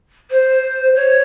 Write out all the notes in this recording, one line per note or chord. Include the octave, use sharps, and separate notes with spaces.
C5
C#5